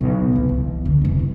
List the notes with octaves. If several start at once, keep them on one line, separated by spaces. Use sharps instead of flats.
B1
D1 C2
E3
D3
F1 C2
G2